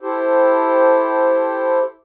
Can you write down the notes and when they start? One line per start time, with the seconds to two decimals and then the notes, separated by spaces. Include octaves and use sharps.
0.01 E4 G4 A4 C5